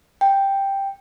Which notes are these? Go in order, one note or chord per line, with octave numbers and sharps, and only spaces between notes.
G5